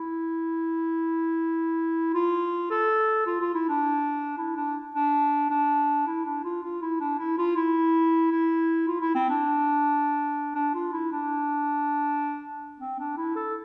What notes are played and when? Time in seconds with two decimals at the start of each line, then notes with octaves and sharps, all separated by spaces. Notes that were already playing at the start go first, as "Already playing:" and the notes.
Already playing: E4
2.14 F4
2.70 A4
3.26 F4
3.41 F4
3.54 E4
3.68 D4
4.38 E4
4.56 D4
4.95 D4
5.50 D4
6.07 E4
6.25 D4
6.44 F4
6.63 F4
6.82 E4
7.00 D4
7.18 E4
7.38 F4
7.56 E4
8.31 E4
8.87 F4
9.01 E4
9.15 C4
9.30 D4
10.55 D4
10.74 F4
10.92 E4
11.12 D4
12.80 C4
12.99 D4
13.17 E4
13.36 A4